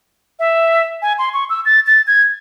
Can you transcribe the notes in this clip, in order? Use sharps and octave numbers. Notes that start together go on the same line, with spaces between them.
E5
G#5
C6
C#6
E6
A6
A6
G#6